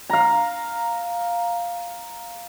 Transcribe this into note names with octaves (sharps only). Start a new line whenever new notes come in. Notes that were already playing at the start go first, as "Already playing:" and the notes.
F5 A#5